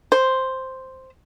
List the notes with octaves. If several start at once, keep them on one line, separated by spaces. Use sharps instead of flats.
C5